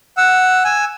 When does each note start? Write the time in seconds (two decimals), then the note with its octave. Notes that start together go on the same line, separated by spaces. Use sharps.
0.17 F#5 E6
0.64 G#5 E6